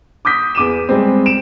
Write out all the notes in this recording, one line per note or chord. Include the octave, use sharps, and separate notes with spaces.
D6 D#6 G6 B6
E2 D6 D#7 E7
G3 G#3 C4
D7 E7